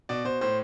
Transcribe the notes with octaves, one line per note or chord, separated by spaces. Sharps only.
B2 D5
B2 C5
A2 C5